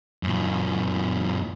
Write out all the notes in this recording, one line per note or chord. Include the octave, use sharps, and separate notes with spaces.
F#2 A#2